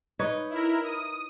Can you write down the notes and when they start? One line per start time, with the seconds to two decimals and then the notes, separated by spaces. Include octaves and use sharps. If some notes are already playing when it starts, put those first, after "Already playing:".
0.19 D#4 B4 C#5
0.50 E4 A#4
0.84 D#6